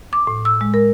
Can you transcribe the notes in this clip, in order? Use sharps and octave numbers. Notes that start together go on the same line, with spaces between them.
D6
A2
E6
G#3
A#4